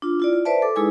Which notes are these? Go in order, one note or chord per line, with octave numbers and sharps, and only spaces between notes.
D4 F4
E4 F4 D5
D5
B4 C5 D5 E5 A5
A4 D6
G#3 D#4 E4 G#4 B4 G#5